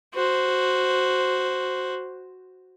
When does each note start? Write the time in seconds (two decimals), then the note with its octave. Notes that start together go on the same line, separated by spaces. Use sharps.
0.14 F#4 C5